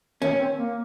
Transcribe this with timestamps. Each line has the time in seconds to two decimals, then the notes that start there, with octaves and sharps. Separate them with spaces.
0.22 D#3 C#4
0.39 C4
0.55 A#3